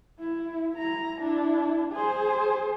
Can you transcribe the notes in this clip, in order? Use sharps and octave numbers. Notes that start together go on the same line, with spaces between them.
E4
E4 A#5
D4 E4
G#4 C5